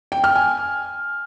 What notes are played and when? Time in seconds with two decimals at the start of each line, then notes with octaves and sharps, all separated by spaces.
0.12 G5
0.24 F6
0.36 G#5